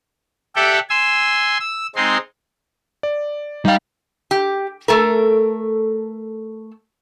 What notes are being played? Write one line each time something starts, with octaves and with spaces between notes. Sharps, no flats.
G4 A4 D5 E5 F#5 G5
G#5 C6 E6
E6
G#3 C4 D#4 C6
D5
G3 D#4 F5 G5
G4
A3 A4 A#4